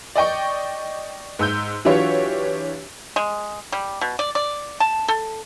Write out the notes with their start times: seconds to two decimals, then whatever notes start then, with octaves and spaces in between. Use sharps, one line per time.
0.16 D5 D#5 G5 C#6
1.39 G#2 E6 G6
1.85 E3 F#3 D4 F4 G4 C#5
3.16 G#3
3.72 G3
4.01 B2
4.19 D5
4.35 D5
4.80 A5
5.08 A4